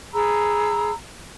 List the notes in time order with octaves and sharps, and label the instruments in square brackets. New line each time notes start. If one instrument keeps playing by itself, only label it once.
[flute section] G#4 A#5 B5 E6